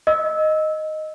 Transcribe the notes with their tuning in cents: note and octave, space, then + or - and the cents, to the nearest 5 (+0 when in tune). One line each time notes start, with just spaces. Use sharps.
D#5 +0 E6 -15